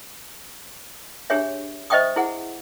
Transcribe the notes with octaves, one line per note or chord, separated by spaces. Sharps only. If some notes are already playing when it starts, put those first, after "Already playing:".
D4 G4 G#4 C#5 E5
C5 D#5 E5 G5 C#6 D#6
E4 G#4 F#5